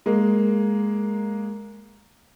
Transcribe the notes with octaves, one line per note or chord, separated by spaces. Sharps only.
G#3 A#3